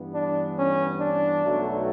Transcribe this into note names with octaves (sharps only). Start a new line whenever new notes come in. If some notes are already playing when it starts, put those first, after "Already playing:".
Already playing: G2 E3 B3
D4
C#4
D4
B1 B2 F#3 A3